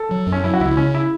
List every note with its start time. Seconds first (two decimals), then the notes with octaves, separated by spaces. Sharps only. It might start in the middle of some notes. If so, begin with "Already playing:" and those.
Already playing: A4
0.11 F#3
0.27 F#2
0.32 C#4
0.44 F#3 E4
0.54 F#4
0.60 C#2 E4
0.77 C#3 C#4
0.94 E4